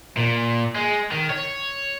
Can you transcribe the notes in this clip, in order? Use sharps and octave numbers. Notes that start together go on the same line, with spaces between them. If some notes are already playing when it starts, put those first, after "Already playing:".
A#2
G#3
D#3
C#5